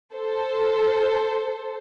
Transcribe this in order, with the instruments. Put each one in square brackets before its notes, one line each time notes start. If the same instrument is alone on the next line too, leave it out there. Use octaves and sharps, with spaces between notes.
[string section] A4 C5